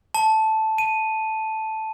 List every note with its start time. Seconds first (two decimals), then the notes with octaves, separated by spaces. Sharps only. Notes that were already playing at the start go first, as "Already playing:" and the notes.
0.14 A5
0.78 D#7